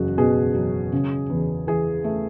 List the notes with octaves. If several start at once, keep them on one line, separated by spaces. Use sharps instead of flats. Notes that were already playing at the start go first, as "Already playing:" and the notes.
Already playing: F#1 E2 F#4 G#4
B2 G#4
F#3
C#3
E2
E3 G#4
A3